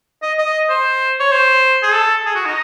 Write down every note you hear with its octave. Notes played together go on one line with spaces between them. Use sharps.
D#5
D#5
C5
C#5
C5
G#4
A4
G#4
F#4
D#4